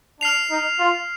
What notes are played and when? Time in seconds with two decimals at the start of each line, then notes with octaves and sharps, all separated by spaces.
0.20 D4 F6 C7 F7
0.51 D#4
0.79 F4